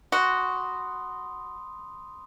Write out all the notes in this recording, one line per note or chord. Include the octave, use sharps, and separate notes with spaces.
F#4 B5 C6 D#6